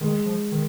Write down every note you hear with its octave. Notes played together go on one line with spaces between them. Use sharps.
D#3 G#3
F3
D#3